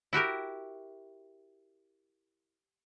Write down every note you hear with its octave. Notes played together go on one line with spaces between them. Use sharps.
E4 F#4 G4 A#4